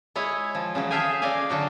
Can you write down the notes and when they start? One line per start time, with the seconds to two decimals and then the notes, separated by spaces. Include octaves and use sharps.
0.15 G#3 E4 C#5 G#5
0.55 F3
0.75 C#3 E3 F#3
0.91 G#4 A4 E5 F5 G5 G#5
1.22 C#3 D5 D#5 F5 G#5
1.50 D3 F#3 F#4